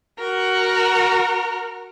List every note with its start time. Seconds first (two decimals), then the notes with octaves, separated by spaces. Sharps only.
0.19 F#4 A#4